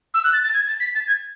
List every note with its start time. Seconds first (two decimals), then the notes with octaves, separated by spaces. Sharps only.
0.14 E6
0.24 F#6
0.33 A6
0.44 A6
0.54 G#6
0.68 A6
0.80 B6
0.95 A6
1.07 G#6